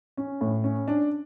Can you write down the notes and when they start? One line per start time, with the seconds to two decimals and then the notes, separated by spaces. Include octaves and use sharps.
0.17 C#4
0.41 A2
0.64 C#4
0.88 D4